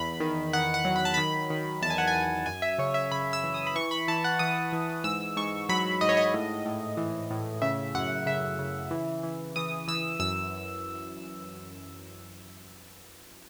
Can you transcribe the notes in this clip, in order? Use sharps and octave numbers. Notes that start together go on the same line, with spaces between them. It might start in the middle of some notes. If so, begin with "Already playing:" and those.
Already playing: E2 B5
D#3
D#3 F#5
F#5
F#3
B5
A5
D#3 B5
D#3
E2 A5
G#5
F#5
G#5
E2
F#2 G#5
E5
C#3 C#5
E5
C#3 B5
E6
E3
D#6
B5
E3 C#6
B5
E3 A5
F#5
E3 D#6
E3
G#2 E6
G#2 C#6
F#3 B5
G#2 D#5
C#5
D#5
A2
A2
E3
A2
C#3 E5
F#2 F#5
C#3 E5
C#3
E3
E3
E3 D#6
E3 E6
F#2 E6